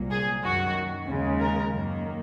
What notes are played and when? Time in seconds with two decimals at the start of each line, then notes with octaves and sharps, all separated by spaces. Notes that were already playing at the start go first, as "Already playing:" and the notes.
Already playing: C2 A#2 F#3 A#3
0.11 G#4
0.43 F#2 D#3 F#3 F#4
1.08 D#2 C#3 G#3
1.40 A#4
1.72 F#2 D#3 A#3